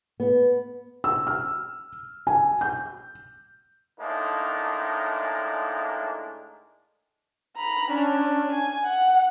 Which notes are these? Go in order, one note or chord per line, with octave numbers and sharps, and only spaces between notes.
B3
E6
F6
G#5
G6
A2 G#3 A#3 D4 D#4
A#5 B5
C#4 D4
G#5
F#5